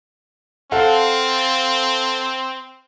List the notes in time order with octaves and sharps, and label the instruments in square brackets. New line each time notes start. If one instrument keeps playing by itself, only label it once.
[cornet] C4 [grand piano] A4 F5 F#5